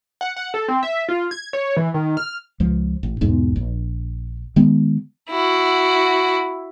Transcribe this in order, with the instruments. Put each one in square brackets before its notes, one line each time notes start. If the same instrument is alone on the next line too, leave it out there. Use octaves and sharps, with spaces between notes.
[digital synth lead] F#5
F#5
A4
C4
E5
F4
G#6
C#5
E3
D#3
F6
[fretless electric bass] C#2 F3
A1
B1 E2 G#2
A#1
D#3 G#3 B3
[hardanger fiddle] E4 F#4